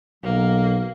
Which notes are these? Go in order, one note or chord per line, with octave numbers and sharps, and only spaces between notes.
B1 F#3 A#3